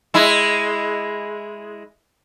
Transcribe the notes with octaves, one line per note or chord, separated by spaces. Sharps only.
G#3 E4